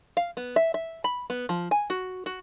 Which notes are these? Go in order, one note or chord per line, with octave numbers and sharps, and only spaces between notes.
F5
B3
E5
E5
B5
B3
F3
G#5
F#4
F#4